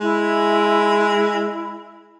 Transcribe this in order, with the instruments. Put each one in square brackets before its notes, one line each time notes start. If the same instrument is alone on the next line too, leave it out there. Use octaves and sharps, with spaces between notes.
[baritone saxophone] G#3 [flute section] E4